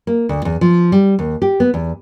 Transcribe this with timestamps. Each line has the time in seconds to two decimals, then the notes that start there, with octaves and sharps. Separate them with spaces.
0.07 A#3
0.29 D2
0.45 E2
0.61 F3
0.92 G3
1.19 D#2
1.42 G4
1.60 B3
1.74 E2